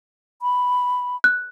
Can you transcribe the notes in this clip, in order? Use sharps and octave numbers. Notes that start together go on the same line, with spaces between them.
B5
F#6